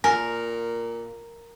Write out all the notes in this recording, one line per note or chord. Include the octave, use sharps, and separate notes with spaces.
A#2 A#4 G#5